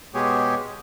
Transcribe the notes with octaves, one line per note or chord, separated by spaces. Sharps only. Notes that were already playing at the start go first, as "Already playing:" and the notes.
B2 G#3 B3 G4 G#4 C#5